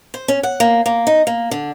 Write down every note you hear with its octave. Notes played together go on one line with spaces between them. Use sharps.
C5
C#4
F#5
A#3
A#3
D#4
A#3
D3